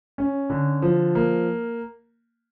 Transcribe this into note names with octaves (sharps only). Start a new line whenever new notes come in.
C#4
D3
F3
A#3